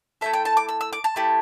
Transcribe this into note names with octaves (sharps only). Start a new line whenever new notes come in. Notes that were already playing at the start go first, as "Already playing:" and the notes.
A3 E4 A4 E5
G5
A5
D6
E6
E6
D6
A5
A3 E4 G4